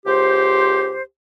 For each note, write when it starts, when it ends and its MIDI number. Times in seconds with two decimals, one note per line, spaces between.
0.06 1.02 37
0.06 1.02 67
0.06 1.02 72